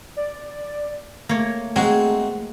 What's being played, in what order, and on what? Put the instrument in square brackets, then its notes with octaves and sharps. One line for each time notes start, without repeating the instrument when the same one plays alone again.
[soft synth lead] D5
[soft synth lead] A3 [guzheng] A#3 C#5
[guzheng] G#3 [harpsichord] C4 D#4 F#4